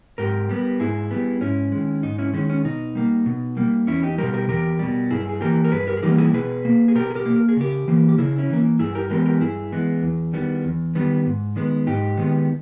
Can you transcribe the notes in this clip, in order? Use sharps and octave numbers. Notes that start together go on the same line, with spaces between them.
G#2 G4 A#4
G3 B3
G#2 E4 G#4
G3 B3
G#2 C#4 E4
D#3 G#3
G#2 D#4
C#4 E4
D#3 G#3 C#4
C#4
B2 D#4
G3 A#3
B2
G3 A#3
E2 C#4 E4
D#4 G4
B2 G3 G4 A#4
G4 A#4
E2 G4 A#4
B2 G3
G2 E4 G#4
G#4
E3 G3 A#3 G4 A#4
A#4
G2 G#4 B4
G4 A#4
G#4
E3 G3 A#3 D#4 G4
A#4
E4 G#4
B2 G#4 B4
A#3
G#4
B2 G4 A#4
G#4
G4 A#4
A#3
A#4
G#4
C#3 G4 A#4
E3 A#3
G4
C#3 E4 G#4
C#4 E4
E3 A#3
G2 E4 G#4
G4 A#4
E3 G#3 B3 G4 A#4
G4 A#4
G2 E4 G#4
E3 G#3 B3
E2
D#3 G3 B3
E2
D#3 G3 B3
G#2
D#3 G#3 B3
G#2 D#4 G4
D#3 G#3 B3